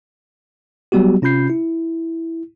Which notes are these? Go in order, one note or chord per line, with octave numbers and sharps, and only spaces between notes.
F#3 G3 B3 F#4 G4
C3 C#4 F4 B5 G6 C7
E4